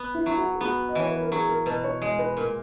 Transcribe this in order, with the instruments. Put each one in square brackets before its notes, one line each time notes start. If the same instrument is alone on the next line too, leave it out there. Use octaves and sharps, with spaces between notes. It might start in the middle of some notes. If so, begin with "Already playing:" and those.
Already playing: [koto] B3
[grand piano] E4
[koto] F#3 [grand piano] E4
[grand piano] F#4
G#4
[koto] B3 [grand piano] F#4
[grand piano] D#5
[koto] E3 [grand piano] C#5
[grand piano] B4
A#4
[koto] F#3 [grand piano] G#4
[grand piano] A#4
[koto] B2 [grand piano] B4
[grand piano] C#5
[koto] G#3 [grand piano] D#5
[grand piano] B4
[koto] A#2 [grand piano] A#4